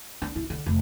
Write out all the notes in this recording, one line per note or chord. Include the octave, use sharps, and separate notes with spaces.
D4
E4
D3
F1